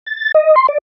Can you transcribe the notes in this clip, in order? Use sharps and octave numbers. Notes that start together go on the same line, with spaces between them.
A6
D#5
C6
D5